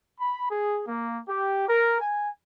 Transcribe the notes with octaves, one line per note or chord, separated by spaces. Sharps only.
B5
G#4
A#3
G4
A#4
G#5